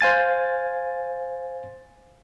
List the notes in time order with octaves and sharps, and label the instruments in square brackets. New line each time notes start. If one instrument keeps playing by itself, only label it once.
[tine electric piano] C5 F5 G#5 A6